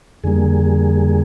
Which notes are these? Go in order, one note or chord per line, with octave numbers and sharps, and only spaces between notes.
F2 D3 G3 A#3 G#4